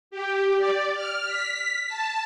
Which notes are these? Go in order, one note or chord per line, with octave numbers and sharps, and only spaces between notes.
G4
D5
F6
B6
A5